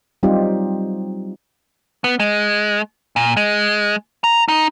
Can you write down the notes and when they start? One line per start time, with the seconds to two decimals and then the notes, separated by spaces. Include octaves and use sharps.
0.23 F#3 G3 C4 D#4 F4 G4
2.04 B3
2.20 G#3
3.16 A#2
3.37 G#3
4.24 A#5
4.48 D#4